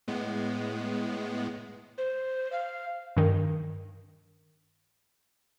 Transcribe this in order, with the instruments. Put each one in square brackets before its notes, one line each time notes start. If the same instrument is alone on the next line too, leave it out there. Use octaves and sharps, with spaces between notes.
[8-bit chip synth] A2 G#3 B3
[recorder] C5
F5
[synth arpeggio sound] G2 D#3